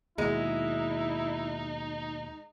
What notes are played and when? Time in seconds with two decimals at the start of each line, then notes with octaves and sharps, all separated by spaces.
0.18 D#2 B2 G#3 D#4 E4